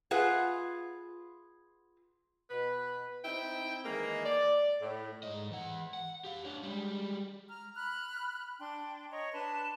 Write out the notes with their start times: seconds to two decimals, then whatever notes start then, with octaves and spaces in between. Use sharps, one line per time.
0.11 F4 G#4 B4 F5 F#5
2.50 B2 B4
3.25 C4 D#4 E4 G5
3.85 D#3 E3 G#3 A#3
4.25 D5
4.82 A2
5.23 G#2 D#5
5.52 E3 F#5
5.94 F#5
6.24 G4 F5
6.45 D4 C#5
6.63 G3 G#3
7.48 A#5 F6
7.75 B5 F6 F#6
8.59 D4 G5 C6
9.10 C#5 D#5 A#5 C#6
9.32 D4 B4 A5 C6